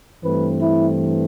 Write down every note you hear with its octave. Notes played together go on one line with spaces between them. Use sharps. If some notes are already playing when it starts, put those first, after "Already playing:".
G2 E3 A3 C4 B4
E4